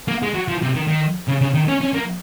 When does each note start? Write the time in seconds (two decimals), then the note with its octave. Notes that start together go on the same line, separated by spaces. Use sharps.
0.08 A#3
0.23 G#3
0.35 F#3
0.48 F3
0.62 C3
0.76 D#3
0.88 D#3
1.28 C#3
1.42 C#3
1.55 D#3
1.69 C#4
1.81 C#4
1.95 A#3